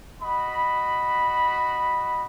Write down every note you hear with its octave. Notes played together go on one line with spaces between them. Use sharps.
F#4 D#5 B5